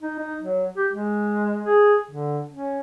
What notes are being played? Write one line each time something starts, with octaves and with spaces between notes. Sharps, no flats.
D#4
D#4
F#3
G4
G#3
G#4
D3
C#4